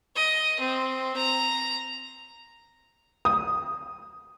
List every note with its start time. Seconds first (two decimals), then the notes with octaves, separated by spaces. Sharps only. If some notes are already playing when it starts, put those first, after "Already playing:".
0.16 D#5
0.60 C4
1.17 A#5
3.25 D#6